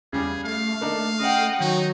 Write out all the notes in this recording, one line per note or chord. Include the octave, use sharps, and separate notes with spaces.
E2 C#3 G3 G#4
A3 F5
A#3 D4 D#4
C#3 D#5 F#5 G5
D#3 F#3 D#4